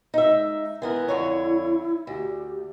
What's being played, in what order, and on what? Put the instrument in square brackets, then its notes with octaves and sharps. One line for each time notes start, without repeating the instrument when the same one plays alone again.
[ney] G#3 [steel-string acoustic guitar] D#4 E5
[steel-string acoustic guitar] E3 B3 A#4 [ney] E4
[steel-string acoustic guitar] F2 D3 C#5
[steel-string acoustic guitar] D2 [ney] G4